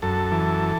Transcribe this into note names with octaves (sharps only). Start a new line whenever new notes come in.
F#2 A4
E3